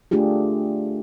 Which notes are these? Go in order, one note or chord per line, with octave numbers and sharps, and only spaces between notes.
A3 D4 F4 G4 G#4